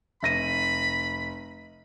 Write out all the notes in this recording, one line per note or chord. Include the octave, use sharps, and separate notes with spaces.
F1 B5 A#6 D#7